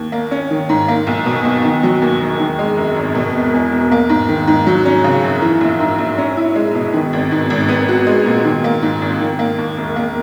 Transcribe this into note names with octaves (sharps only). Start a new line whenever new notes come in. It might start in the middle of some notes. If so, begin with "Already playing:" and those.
Already playing: D#2
A#3
C#4
D#3
G#2
A#3
B1
B2
B1
D#3
F#3
D#2
E1
D#3
G#3
F#2
G#1
B2
E1
E2
E1
A#3
G#2
D#3
G#2
F#3
C#4
C#3
F#2
E3
A#1
G#2
A#1
C#4
E4
G#3
B2
D#3
G#1
G#2
G#1
B3
F#4
G#3
A#2
D#3
A#3
G#2
G#1
D#3
A#3
D#2
E1
A#3